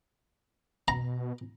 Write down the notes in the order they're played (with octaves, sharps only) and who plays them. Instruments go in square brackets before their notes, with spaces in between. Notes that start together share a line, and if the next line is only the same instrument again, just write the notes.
[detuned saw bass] B2 [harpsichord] A#5